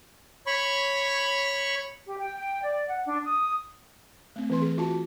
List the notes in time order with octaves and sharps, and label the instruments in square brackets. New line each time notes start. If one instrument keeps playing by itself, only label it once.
[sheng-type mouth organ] C#5 B5 C#6
[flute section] G4
G5
G5
D5
F#5
D4
D#6
[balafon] A3 C4
E3 C4 B4 C6
G#4
F4 F#4 A5